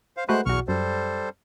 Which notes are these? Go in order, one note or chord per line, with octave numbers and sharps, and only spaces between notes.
C5 F5
G#3 A3 F#4 B4 C5 F#6
B1 E2 F#4 C#6 F6
F#2 G3 A4 C5